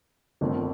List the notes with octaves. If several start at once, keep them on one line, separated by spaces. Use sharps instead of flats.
G1 F2 D#3 A3 C4